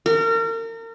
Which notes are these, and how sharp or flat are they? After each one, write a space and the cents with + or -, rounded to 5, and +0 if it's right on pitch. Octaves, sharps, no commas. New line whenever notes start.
A#4 -35